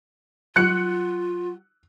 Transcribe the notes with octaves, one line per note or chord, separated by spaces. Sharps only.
F#3 F4 F#5 F#6 C#7